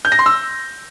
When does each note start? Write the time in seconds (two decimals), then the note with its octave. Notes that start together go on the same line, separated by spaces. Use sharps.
0.05 G6
0.12 A#6
0.19 C6
0.26 E6